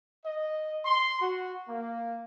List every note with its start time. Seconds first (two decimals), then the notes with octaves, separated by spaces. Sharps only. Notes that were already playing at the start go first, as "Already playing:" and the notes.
0.25 D#5
0.84 C6
1.20 F#4
1.68 A#3